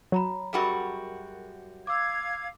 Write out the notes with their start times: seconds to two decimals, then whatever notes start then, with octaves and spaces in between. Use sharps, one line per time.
0.12 F#3 C#5 A#5 B5
0.53 F#2 G3 F#4 G#4 A#4
1.87 F5 D6 E6 G#6